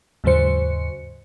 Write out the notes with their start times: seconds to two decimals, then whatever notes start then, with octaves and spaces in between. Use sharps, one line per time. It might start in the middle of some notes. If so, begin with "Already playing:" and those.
0.24 D#2 G#2 C#3 F#3 C5 C#7